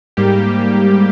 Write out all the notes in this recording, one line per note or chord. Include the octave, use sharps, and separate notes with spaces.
G#2 G3 A#3 G4